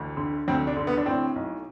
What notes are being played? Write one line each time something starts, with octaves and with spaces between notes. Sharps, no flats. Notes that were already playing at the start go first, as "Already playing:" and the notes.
Already playing: A1 D2
D3
D2 C4
D4
D3
B3
D4
A2 C4
B1